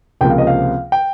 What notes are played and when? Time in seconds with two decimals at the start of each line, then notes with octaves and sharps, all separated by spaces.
0.21 C#2 C3 F3 A#3 G5
0.30 F5
0.38 D#5
0.47 F5
0.92 G5